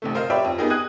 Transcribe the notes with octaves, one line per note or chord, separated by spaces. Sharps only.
A1 C3 A3
A#4 C5 D#5 F5
G4 B4 C#5 D5 E5 G5
F2
B3 D#4 G4 G#4 A#4
D#6 F#6 G#6 D#7